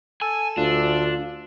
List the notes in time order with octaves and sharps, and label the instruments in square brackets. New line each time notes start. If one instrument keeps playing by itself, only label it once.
[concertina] A4 E6 [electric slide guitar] G#5
[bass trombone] D2 [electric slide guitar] D4 [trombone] F4